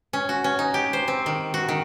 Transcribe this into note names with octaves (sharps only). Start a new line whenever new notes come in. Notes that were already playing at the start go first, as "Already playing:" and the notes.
C#4
F#4
C#4
D#4
G4
C5
C4
D#3
F#4
D#3